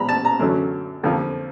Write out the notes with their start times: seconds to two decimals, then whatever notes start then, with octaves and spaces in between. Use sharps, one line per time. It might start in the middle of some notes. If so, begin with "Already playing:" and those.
Already playing: A#2 F3 G#3 B3 A#5 B5
0.09 A5
0.25 A#5
0.39 F#2 D3 F#3 A3
1.03 F2 D3 F3 A#3